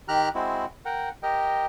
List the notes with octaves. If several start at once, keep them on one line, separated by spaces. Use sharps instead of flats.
D#3 G4 A#5 F6 F#6
G#3 C4 E4 F#4
A#4 F#5 G5
G4 A#4 D#5 G5